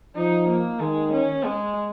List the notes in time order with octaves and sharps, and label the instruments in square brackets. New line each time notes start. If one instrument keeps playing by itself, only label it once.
[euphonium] F3 [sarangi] D#4
[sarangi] A#3
[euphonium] D#3 [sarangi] G#3
[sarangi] C#4
G#3